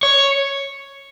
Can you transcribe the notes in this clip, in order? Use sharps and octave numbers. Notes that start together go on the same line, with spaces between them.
C#5